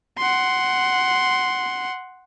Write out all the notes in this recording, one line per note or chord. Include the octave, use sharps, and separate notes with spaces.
F#5 C6